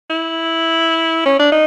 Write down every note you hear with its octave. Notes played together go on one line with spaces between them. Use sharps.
E4
C#4
D4
D#4